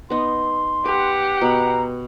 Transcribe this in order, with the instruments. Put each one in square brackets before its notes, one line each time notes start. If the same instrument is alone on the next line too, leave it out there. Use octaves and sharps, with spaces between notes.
[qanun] B3 D#4 [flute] C6
[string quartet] G4 F#5 [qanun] B4
[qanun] B2 B5 [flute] A#5